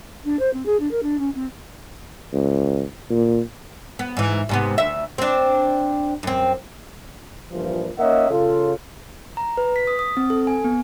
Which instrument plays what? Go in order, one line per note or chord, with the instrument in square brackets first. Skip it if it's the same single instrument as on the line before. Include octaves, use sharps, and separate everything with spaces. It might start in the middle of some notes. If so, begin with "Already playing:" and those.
[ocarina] D4
C5
C4
G#4
D4
A#4
D4
C#4
C4
[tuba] C#2
A#2
[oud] B3
G#2 E3
G#2 C3 B3
D2 E5
C4 D4
F#2 C4
[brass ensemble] G2 A#2 E3 F3
A#3 C#4 D#4 D#5 E5 F#5
C#3 F4 A4
[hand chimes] A#5
B4
B6
D#6
D#6
C4
A4
G#5
B3